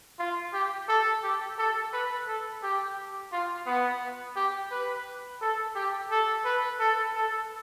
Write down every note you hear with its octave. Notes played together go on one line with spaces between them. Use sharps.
F4
G4
A4
G4
A4
B4
A4
G4
F4
B3
G4
B4
A4
G4
A4
B4
A4
A4